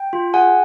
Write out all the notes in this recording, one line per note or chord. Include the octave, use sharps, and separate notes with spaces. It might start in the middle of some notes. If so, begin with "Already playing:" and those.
Already playing: G5
F4
G#4 F#5 G#5